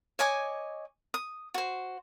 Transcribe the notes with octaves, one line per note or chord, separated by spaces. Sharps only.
C#5 D#5 G#5 D6
D#6
F#4 C5